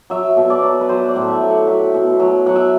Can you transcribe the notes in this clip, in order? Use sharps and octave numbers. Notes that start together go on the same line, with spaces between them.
F#3 E5
B2
D5
F#3
B4
F#3 C5
D5
A2
E5
F#3
F#5
F#3 E5
B2
F#3
F#3 F#5
E5